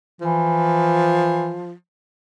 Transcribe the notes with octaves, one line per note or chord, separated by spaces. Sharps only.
E3 F3